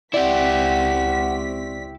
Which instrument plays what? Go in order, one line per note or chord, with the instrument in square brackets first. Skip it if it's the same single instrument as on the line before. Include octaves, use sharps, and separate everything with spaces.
[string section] C#2 C4 B6 [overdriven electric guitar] E4 G4 [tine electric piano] D5 [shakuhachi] F#5